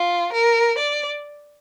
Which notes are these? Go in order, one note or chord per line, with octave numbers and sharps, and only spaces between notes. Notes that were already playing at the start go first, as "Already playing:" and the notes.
Already playing: F4
A#4
D5